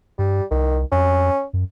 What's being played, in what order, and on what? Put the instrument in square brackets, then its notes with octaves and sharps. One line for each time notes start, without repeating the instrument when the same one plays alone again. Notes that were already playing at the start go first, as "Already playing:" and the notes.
[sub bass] G2 [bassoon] G3
[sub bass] C2 [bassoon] D#3
[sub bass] F2 [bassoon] C#4
[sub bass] F#2